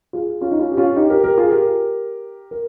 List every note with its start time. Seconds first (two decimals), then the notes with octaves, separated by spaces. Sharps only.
0.13 F4 G#4
0.41 C#4 F4
0.51 D#4
0.60 C#4 F4
0.72 G4
0.77 C#4 F4
0.96 D#4 G4
1.10 G4 A#4
1.24 G4 A#4
1.38 F4 G#4
1.51 G4 A#4
2.51 A#4